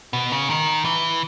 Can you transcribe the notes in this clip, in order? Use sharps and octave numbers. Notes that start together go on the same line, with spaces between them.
B2
C#3
D#3
E3